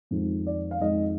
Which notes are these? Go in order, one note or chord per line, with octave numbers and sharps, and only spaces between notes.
F2 D#3 G#3
D5
F5
F2 D#3 G#3 D#5